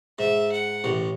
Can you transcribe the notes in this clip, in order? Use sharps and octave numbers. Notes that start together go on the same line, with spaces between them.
G#2 E5
F#5
A1 A2